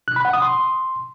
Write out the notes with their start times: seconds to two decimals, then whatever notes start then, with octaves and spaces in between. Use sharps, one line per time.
0.08 F#6
0.16 B5
0.25 F#5
0.33 D#6
0.42 C6